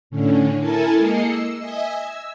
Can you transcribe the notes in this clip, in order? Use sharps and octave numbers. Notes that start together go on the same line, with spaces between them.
A2 D3 C#4
E4 A4 A#4 G#5 A5
G#3 A#3 D#5 C7 C#7
E6
D#5 E5 G#5 G#6
E6